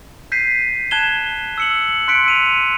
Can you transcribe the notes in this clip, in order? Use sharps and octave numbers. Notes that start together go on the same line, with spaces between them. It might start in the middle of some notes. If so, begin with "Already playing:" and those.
G6 B6 C7 D#7
A5 F#6 G#6 E7 G7
E6 C#7 F#7
C6 F#6 B6 C#7 D7
E6 D#7 F7